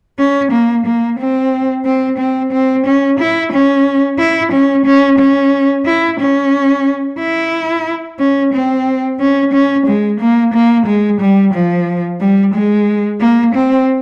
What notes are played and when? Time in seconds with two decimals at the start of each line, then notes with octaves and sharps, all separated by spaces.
0.19 C#4
0.52 A#3
0.86 A#3
1.19 C4
1.85 C4
2.18 C4
2.52 C4
2.86 C#4
3.19 E4
3.52 C#4
4.19 E4
4.52 C#4
4.85 C#4
5.19 C#4
5.85 E4
6.20 C#4
7.19 E4
8.19 C#4
8.53 C4
9.20 C#4
9.53 C#4
9.86 G#3
10.20 A#3
10.54 A#3
10.86 G#3
11.21 G3
11.54 F3
12.20 G3
12.54 G#3
13.20 A#3
13.54 C4